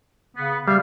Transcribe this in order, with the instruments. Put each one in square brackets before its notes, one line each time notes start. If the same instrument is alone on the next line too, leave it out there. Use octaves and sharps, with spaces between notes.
[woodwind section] C#3 B3
[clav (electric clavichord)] G3 [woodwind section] E5 F5